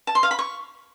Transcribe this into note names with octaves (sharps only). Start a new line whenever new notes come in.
A5
C6
F5
B5
C#6